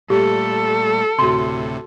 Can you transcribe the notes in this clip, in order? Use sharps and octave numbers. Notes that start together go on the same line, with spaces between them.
A#2 G3 A3 G4 A4
D2 A2 C3 F#4 C6